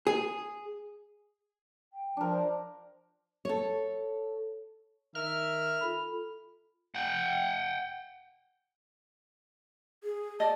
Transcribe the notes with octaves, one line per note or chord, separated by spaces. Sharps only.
G#4
G5
F3 D4 A#4
C5
A4 C#5
D#3 A#4 E5 F6
F4 A4 B5
F#5 G5
G#4
D5 D#5 A5